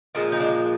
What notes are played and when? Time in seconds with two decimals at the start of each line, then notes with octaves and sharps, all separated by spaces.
0.15 A#2 F3 G#3 C4
0.32 D#4
0.39 A#3 D4